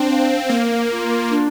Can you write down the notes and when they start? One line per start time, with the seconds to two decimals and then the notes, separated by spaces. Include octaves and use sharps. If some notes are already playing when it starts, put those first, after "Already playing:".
Already playing: C4 D4
0.10 F5
0.49 A#3 A#4
0.90 F4
1.30 D4